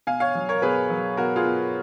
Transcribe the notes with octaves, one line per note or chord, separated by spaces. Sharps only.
B2 F5 G#5
C#5 F5
F#3
A#4 C#5
B2 G#4 B4
F#3
B2 F#4 A#4
F4 G#4
B2